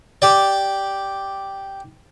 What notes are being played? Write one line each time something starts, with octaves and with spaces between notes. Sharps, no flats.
G4 D5